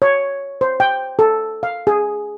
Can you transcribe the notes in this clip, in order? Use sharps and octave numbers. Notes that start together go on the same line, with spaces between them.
C#5
C5
G5
A4
F5
G#4